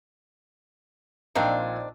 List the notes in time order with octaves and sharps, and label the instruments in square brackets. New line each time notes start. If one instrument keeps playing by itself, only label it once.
[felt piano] A#1 A#2 F5 [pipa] D#3 C4 D4